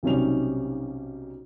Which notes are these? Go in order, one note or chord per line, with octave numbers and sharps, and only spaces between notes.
B1 C3 G3 C#4 D#4 F7